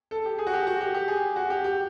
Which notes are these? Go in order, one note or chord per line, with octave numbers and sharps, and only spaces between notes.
A4
G4
G#4
F#4
G4
F#4
G4
G4
G#4
F#4
G4
G4